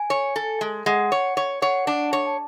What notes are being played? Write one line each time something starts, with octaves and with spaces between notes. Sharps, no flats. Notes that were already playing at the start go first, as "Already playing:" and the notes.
Already playing: G#5
C#5
A4
G#3
G#3 F#5
C#5
C#5
C#5 F#5
D4
C#5
A5